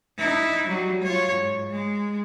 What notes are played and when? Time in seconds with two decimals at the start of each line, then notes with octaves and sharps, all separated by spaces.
0.18 D#4 E4
0.67 F#3 G3
1.02 F4 C#5
1.33 G#2
1.70 G#3